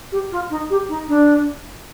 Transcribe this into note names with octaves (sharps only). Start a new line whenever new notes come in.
G4
F4
D#4
G4
D#4
D4